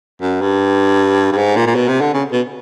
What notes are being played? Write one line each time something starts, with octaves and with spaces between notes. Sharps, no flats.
F#2
G2
G2
G#2
A#2
A#2
B2
C3
D3
C#3
B2